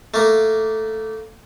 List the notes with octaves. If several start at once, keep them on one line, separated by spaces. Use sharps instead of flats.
A3 A#3